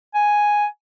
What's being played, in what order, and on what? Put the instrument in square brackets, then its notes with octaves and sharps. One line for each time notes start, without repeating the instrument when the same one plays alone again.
[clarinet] G#5